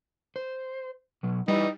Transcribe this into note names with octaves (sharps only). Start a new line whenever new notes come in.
C5
B2 F#3
G3 D#4 E4 B4